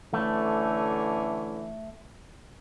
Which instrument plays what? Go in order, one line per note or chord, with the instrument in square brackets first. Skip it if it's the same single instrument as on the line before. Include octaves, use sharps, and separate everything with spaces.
[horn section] D3 E3 C#4 [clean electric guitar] A3